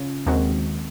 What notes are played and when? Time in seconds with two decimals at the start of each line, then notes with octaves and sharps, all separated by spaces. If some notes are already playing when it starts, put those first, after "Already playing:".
Already playing: C#3 C#4 F4
0.26 D#2 D#3 G#3 C4 F#4